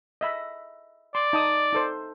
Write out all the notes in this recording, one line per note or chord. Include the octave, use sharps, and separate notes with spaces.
D#5 E5 B5
D5 C6
D#4 A5 D#6
D#4 A4 C5